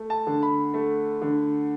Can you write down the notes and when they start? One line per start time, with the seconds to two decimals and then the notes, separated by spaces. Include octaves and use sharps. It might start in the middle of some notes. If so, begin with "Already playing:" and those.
Already playing: A3
0.10 A5
0.27 D3
0.43 B5
0.74 A3
1.22 D3